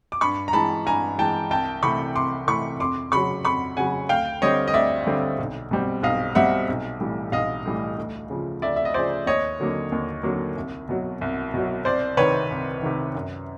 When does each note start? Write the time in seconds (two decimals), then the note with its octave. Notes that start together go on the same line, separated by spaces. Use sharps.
0.12 D6
0.21 G2 B5 C#6
0.48 A#5
0.53 E3 G#3 A5 B5
0.86 G2 G#5 A#5
1.18 E3 G#3 G5 A5
1.50 C2 G5 A5
1.83 C3 E3 A3 B5 C#6
2.15 C2 C6 D6
2.47 C3 E3 A3 B5 C#6
2.79 F2 C6 D6
3.12 C#3 F#3 B5 C#6
3.45 F2 B5 C#6
3.77 C#3 F#3 F#5 G#5
4.09 D2 F5 G5
4.42 D3 G3 C4 C#5 D#5
4.68 D#5
4.74 D2 D5 E5
5.07 D3 G3 C4
5.39 B1
5.71 B2 G3 C4
6.03 B1 D#5 F5
6.35 B2 G3 C4 E5 F#5
6.69 B1
7.00 A2 E3 G3
7.32 B1 D#5 F5
7.66 A2 E3 G3
7.98 D2
8.30 C#3 F3
8.62 D2 D5 E5
8.76 E5
8.85 D#5
8.94 C#3 F3 C5 D5
9.26 D#2 C#5 D#5
9.60 D3 F#3 A#3
9.92 D#2
10.23 D3 F#3 A#3
10.57 C2
10.89 B2 F#3
11.21 C2
11.54 B2 F#3
11.85 C2 C5 D5
12.17 C3 D#3 B4 C#5
12.51 C2
12.82 C3 D#3
13.15 F#2